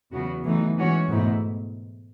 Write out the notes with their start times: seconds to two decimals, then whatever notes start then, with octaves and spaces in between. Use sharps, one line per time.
0.12 E2 C#3 F#3 B3 F#4
0.44 E3 F#3 A3 D#4
0.77 E3 G#3 C#4 F#4 C#5
1.09 E2 G#2 B2 A3 E4